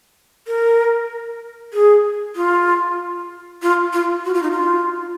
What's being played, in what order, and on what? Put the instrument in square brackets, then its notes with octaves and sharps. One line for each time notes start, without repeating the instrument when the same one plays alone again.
[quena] A#4
G#4
F4
F4
F4
F#4
F4
D#4
F4